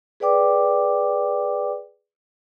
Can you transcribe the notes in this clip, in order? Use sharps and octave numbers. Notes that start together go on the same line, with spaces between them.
G#4 B4 D5 G5 D6